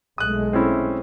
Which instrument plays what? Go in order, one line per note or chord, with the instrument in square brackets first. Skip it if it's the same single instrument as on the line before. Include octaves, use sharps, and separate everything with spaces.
[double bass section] B1 G#3 A3 [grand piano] D#6 F#6
[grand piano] C4 C#4 E4